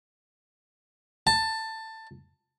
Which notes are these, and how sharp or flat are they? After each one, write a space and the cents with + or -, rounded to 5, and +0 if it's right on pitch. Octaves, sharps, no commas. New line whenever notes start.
A5 +15